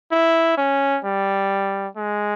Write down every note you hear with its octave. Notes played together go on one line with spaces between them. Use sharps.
E4
C#4
G3
G#3